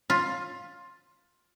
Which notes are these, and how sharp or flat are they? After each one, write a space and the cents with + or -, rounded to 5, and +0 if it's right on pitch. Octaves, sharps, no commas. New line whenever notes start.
F4 +15